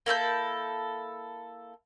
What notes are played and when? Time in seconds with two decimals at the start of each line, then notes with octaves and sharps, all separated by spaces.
0.06 A#3 E4 A4 G6